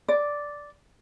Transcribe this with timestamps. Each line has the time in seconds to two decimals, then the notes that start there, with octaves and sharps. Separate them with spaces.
0.08 D5